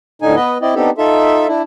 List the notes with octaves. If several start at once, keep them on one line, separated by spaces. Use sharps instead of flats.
D2 A2 D3 D#4 G#5
B3 B4 D#5
C4 E4 D5 D#5
B3 C4 D4 D#4 G4 A4
D#4 F4 A4 E5
D4 E4